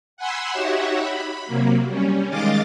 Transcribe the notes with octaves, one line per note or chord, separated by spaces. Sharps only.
F#5 G#5 B5 C6 E6
D#4 F#4 G4 C#5 E5 F#5
B5
C3 F#3 A#3
G3 C#4
D#3 G#3 D#5 F5 D6 A6